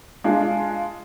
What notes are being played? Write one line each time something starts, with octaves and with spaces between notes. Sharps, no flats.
G#3 D4 F4